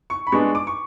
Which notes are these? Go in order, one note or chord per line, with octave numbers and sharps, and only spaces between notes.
C#6
B5
G#3 B3 D4 C#6
D6
C#6